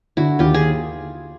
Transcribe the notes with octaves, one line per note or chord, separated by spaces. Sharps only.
D3 E4 F#4
D#2 F4 G4
G#4